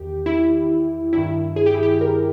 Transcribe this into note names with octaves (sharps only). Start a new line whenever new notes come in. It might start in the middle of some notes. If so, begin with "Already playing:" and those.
Already playing: E2 D#3 G4
E4
G2 D#3 E4
G#4
G4
E4
G4
A#4